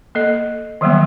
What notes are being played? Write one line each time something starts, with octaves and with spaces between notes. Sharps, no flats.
A#3 A4 D#5
D#3 E3 F#3 G3 A#3 B3